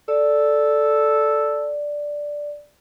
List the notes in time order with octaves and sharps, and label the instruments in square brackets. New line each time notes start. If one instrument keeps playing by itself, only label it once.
[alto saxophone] A4 [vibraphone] D5